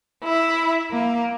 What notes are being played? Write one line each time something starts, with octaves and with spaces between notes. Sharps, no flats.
E4
A#3